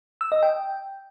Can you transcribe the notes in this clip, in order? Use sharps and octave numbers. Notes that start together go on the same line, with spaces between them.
E6
D#5
G5